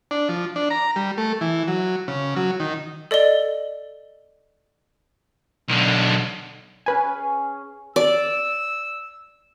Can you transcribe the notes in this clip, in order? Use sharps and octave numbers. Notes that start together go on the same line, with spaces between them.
D4
F3
D4
A#5
G3
A3
E3
F#3
C#3
F#3
D#3
A4 D5 D#5 G7
B1 D3
C#4 G#4 B4 G#5
D5 E6